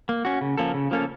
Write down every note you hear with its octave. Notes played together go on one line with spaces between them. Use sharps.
A#3
C#4 F#4
C#3
F3 A#3 C#4 A4
C#3
F3 A#3 C#4 A4